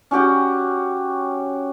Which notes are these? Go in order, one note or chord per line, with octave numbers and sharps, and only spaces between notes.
C#4 F#4 G4 F#5